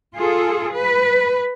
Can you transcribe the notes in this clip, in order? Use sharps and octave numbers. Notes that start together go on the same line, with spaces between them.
F4 G#4 A4
B4